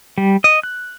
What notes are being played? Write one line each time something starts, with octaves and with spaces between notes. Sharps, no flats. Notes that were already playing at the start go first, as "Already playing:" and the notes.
G3
D#5
F#6